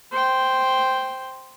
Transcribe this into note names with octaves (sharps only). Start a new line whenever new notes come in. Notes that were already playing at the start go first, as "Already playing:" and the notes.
C5 G5